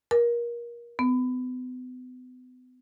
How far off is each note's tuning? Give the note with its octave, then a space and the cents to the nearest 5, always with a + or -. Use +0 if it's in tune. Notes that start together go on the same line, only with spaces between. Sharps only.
A#4 +25
B3 +40